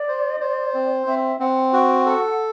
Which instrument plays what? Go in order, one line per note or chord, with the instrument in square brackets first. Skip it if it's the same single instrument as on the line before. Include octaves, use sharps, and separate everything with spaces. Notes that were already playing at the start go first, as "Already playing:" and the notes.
Already playing: [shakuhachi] D5
[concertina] C5
C5
C4
[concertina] C4 [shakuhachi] E5
[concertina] C4 [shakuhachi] F#5
[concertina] F#4 [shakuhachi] G5
[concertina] A4 [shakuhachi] F#5